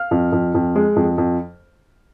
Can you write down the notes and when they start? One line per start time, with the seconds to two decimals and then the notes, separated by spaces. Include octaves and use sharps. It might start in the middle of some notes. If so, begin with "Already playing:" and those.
Already playing: F5 F6
0.11 F2
0.32 F2
0.55 F2
0.76 G#3
0.96 F2
1.18 F2